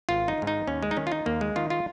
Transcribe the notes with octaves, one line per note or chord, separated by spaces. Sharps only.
G#1 F4
D#4
G#2 D#3
D#4
D#2 C#4
G#3
D#4
D#3 C#4
F4
D#4
D#2 A#3
G#3
D#3 F4
F4